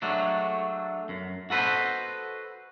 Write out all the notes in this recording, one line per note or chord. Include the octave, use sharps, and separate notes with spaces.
F#3 G#3 A3 D4
F#2
F#4 A4 B4 C5 D#5